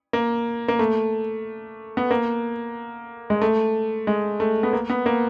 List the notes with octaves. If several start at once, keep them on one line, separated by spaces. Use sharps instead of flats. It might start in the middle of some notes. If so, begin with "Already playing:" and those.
A#3
A#3
A3
B3
A#3
G#3
A3
G#3
A3
B3
A#3
B3
A#3